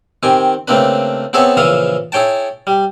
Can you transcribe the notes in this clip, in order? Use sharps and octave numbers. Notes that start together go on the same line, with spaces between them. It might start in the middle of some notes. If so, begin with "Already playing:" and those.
D#3 C4 G4 G#5
C#3 A3 A#3 C4 D4 B4
B3 C4 G#4 A4 C#5 E5
A#1 C#3 E3 E5 F5 D#6
E4 G#4 C#5 G5 A5
G3